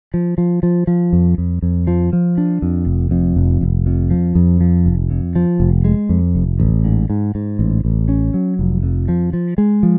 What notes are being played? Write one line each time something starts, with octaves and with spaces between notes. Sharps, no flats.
F3
F3
F3
F3
F2
F2
F2
F3
F3
D4
F2
F1
F2
F1
F1
F2
F3
F2
F3
F1
F2
F3
F1
G#3
F2
F1
A1
G#2
G#2
G#2
A1
A1
C#4
F#3
F1
F2
F3
F3
G#3
F3